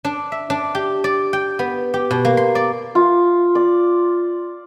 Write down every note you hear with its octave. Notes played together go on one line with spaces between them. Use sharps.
D4
E5
D4
G4
D5
G5
B3
G4
B2
A#3
C6
D5
F4
D5